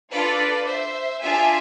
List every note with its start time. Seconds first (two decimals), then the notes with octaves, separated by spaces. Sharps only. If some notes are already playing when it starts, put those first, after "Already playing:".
0.11 D4 F4 A4 B4 D5
0.67 C5 E5
1.22 D4 F4 G#4 E5 G#5